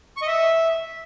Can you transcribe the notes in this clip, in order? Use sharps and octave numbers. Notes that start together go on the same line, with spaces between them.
C#6
D#5
E5